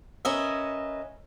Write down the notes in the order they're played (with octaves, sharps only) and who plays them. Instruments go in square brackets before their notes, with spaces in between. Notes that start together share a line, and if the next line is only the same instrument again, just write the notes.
[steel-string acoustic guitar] C#4 A#4 B4 D#5 E5